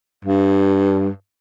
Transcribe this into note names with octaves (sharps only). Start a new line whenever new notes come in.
G2